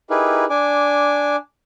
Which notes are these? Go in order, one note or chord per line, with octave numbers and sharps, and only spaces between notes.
D#4 E4 G4 G#4 A#4 B4
D4 G#5 D6